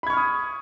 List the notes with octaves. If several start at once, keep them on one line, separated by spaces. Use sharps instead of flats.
B5 C#6 D#6 F6 G#6